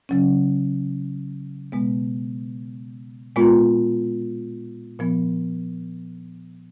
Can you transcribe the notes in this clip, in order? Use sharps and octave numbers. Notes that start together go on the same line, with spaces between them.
C#3 F#3 C#4
B2 G#3 B3
A#2 G#3 B3 F4
A#2 F3 B3